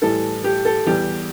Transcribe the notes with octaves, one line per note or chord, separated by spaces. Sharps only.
A2 E3 G3 A4
G4
A4
E2 E3 G3 G4